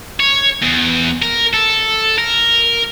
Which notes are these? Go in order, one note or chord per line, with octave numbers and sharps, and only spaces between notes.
C#5
E2
A#4
A4
A#4